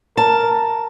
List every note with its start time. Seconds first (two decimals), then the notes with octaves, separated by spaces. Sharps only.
0.17 A#4 A5